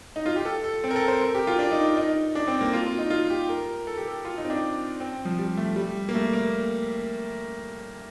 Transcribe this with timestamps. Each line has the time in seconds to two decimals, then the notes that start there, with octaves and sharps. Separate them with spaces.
0.16 D#4
0.26 F4
0.36 G4
0.45 A4
0.64 A4
0.84 C4
0.91 A#4
0.96 A4
1.08 C5
1.21 A#4
1.35 G4
1.47 F4
1.59 D4
1.72 D#4
1.97 D#4
2.35 D4
2.48 C4
2.61 A#3
2.73 F4
2.86 F4
2.99 D#4
3.10 F4
3.30 G4
3.49 A#4
3.87 A4
3.97 G4
4.08 A4
4.25 F4
4.38 D#4
4.44 C4
4.50 D4
5.00 C4
5.25 F3
5.39 G3
5.57 A3
5.76 G3
6.09 A#3
6.14 A3
6.33 A#3